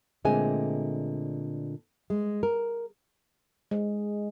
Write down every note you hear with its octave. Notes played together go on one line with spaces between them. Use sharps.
A#2 D3 G#3 A3 C4 G#5
G#3
A#4
G#3